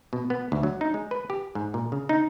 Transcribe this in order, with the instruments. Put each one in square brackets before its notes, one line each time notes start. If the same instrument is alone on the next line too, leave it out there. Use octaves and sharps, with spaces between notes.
[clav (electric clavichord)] B2
B3
D2
F#3
D#4
G#3
B4
G4
G#2
A#2
C#3
D#4